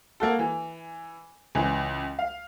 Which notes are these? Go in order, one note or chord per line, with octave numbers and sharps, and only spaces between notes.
A#3 F#4 A4
E3
C#2 E3
F5